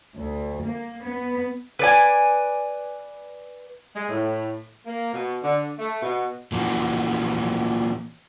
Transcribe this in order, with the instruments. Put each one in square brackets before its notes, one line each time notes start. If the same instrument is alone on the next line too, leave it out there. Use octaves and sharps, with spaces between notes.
[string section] D2
A#3
B3
[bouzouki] B4 D5 G#5
[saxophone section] G#3
A2
A#3
B2
D3
A3
B2
[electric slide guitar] A#2 E3 F3 G3 A#3 F#4